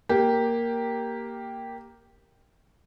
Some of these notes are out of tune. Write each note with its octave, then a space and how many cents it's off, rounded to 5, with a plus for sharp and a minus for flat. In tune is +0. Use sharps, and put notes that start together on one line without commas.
A#3 +0 G4 +0